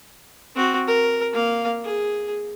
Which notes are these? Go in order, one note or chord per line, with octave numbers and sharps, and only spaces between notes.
C4 F#4
A#4
A#3 F5
G#4